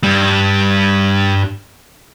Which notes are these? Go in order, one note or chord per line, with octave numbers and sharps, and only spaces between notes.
G2 G3